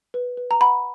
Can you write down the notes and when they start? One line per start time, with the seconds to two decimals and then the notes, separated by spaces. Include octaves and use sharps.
0.14 B4
0.37 B4
0.51 A#5
0.61 F#5 B5